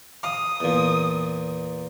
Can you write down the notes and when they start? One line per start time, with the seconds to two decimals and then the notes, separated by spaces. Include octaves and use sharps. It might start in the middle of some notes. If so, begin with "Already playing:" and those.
0.23 F5 D#6
0.60 E2 A#2